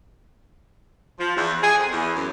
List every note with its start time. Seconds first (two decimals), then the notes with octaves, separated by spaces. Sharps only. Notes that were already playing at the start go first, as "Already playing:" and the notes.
1.19 F3
1.36 E2
1.63 G#4
1.77 F2
1.91 E2
2.15 F#2